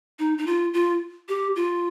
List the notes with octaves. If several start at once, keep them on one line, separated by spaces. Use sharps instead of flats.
D#4
D#4
F4
F4
G4
F4